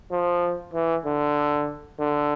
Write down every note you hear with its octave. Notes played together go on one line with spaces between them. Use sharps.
F3
E3
D3
D3